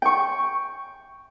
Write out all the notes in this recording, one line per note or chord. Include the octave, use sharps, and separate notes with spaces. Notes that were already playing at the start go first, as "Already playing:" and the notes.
G5 C#6